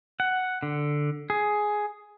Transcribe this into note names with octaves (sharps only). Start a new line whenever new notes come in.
F#5
D3
G#4